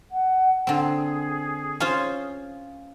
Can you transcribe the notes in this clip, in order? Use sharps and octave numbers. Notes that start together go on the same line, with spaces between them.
F#5
D3 C4 G#4
C#4 F4 C5